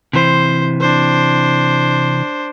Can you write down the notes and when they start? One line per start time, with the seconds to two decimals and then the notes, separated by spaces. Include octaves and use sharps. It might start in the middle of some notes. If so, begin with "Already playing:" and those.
0.13 C3 E3 C5
0.80 D4 C5